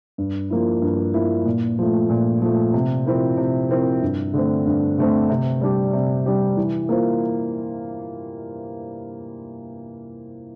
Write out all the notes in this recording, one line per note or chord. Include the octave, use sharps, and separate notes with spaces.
G2
F3 A#3 E4
G2
F3 A#3 E4
A#2
F3 A3
A#2
F3 A3
C3
F3 C4 E4 A#4
C3
F3 C4 E4 A#4
G2
D3 A3 C4
G2
D3 A3 C4
C3
G3 D4 G4
C3
G3 D4 G4
E3
A#3 F4 C5